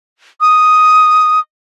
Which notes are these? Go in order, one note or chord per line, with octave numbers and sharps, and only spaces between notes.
D#6